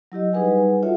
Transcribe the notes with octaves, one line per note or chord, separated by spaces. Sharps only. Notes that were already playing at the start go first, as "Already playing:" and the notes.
F#3 E4 G4 D#5
G3 D#4 G#4 B4 F#5 G#5
F4 F#4 A4 C#5 E5 F#5